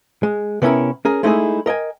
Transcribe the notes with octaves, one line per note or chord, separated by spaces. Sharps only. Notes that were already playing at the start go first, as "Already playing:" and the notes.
G#3
C3 B3 C#4 E4 A#4
C#4 G#4 A#4
G#3 A3 D#4 E4 G4 G#4
A#4 D#5 G5 G#5